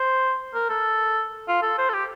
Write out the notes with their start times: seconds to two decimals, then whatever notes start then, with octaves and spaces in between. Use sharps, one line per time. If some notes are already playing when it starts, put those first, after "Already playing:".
Already playing: C5
0.54 A#4
0.69 A4
1.48 F4
1.62 A4
1.78 C5
1.90 A4
1.94 G4